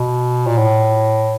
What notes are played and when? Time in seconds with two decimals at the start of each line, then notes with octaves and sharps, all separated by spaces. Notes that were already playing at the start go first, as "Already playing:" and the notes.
Already playing: B2
0.47 A#2
0.58 A2